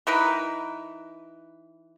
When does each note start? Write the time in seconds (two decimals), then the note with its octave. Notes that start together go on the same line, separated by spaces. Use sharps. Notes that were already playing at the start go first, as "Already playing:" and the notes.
0.07 E3 D#4 A#4 B4